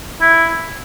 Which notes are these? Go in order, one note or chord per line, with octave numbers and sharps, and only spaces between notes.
E4